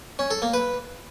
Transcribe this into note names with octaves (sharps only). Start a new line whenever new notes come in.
C#4
A4
A#3
B4